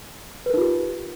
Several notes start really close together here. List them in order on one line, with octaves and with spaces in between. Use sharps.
B4 A#4 D#4 F4 G4